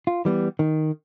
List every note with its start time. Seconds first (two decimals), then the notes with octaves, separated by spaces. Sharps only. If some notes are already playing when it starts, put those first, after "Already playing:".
0.07 F4
0.25 E3 G3 B3
0.59 D#3